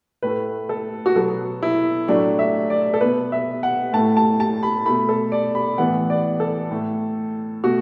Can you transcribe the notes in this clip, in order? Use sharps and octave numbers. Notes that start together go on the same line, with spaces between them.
A2 A3 B4
A4
F#4
B2 F#3 B3 A4
E4
A2 F#3 A3 D4
E5
D5
A4
B2 B3 B4
E5
F#5
A2 A3 A5
A5
A5
B5
B2 A3 B5
A4
D5
B5
A2 E3 B3 F#5
D5
A4
A2 A3
B2 A3 F#4